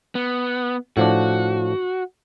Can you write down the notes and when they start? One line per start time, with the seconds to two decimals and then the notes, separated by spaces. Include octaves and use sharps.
0.15 B3
0.97 A2 F3 D4 F#4